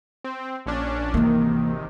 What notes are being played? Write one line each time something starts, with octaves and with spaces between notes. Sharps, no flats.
C4
A#1 C#4 D4
G#1 C3 D#3 E3 A#3